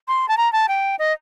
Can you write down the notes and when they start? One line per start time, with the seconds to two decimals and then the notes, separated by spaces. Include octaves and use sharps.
0.08 C6
0.28 A5
0.37 A#5
0.53 A5
0.68 G5
0.99 D#5